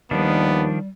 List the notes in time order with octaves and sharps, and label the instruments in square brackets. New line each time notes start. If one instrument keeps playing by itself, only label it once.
[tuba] D#2 [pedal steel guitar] D#3 F3 D4 [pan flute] G3 [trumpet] B3